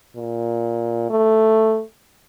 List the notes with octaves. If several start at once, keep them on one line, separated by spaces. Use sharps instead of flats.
A#2
A3